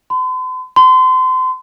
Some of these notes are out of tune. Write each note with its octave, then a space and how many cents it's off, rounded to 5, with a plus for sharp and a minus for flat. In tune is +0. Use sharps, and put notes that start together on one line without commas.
C6 -45
C6 -30